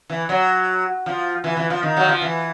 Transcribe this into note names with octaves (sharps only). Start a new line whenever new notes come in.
E3
F#3
F3
E3
E3
F3
D#3
F#3
F3
E3